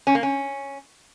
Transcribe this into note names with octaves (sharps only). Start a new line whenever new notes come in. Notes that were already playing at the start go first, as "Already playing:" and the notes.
C#4
A#3
C#4